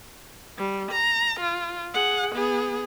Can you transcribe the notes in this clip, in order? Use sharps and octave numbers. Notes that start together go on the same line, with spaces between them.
G3
A#5
F4
G#4 F#5
B3 G#4